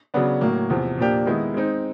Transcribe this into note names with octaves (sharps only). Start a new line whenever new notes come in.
C#3 F#3 B3 D4
A2 F#3 A#3
E2 C3 F3
A#2 F3 A#3 D4 G4
D#3 G#3 B3 E4
G#3 C4 D#4